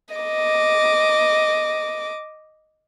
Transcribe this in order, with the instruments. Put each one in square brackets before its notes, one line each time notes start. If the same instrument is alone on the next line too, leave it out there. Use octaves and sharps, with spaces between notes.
[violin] D#5 D6